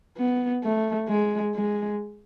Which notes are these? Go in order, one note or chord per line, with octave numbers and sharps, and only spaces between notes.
B3
A3
G#3
G#3